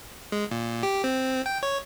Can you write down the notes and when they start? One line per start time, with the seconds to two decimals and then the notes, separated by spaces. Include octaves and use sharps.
0.32 G#3
0.51 A#2
0.83 G4
1.04 C4
1.46 G5
1.63 C#5